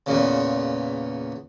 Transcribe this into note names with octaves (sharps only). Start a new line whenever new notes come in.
E2 A#2 C#3